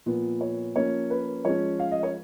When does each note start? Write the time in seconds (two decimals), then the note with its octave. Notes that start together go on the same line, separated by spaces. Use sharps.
0.06 A#2 F3 B3
0.41 C#5
0.76 F3 A#3 C#4 C#5
1.10 B4
1.45 F3 G#3 C#4 C#5
1.80 F5
1.91 D#5
2.03 C#5